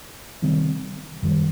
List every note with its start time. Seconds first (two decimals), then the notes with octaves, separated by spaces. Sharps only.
0.42 C3 D#3 G3 C4
1.22 F#2 D#3 G3